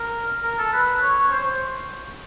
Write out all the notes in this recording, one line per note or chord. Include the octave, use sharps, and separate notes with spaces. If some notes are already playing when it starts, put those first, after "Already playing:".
Already playing: A#4
A#4
A4
B4
C#5
C#5
C5